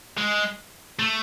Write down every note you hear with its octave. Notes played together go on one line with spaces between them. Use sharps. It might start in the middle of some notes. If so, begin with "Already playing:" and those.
G#3
A3